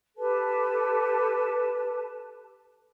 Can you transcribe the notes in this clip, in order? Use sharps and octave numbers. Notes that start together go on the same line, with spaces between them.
G4 A4 B4 A5